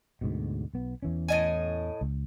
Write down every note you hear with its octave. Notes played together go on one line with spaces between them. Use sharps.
D2 G#2 B2
B1 B3
E2 E3 C#4
A2 D#5 G#5
C#2